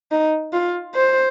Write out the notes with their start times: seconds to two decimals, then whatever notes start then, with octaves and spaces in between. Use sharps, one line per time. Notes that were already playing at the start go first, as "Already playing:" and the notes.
0.12 D#4
0.53 F4
0.95 C5